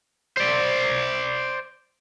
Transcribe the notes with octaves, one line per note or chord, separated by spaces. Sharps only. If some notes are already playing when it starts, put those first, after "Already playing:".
C5 D5